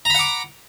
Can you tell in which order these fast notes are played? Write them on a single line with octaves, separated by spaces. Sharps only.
A#5 B5 F#5 D6